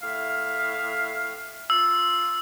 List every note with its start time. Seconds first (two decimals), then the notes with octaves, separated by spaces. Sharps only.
0.01 A2 E5 F5
1.70 F4 E6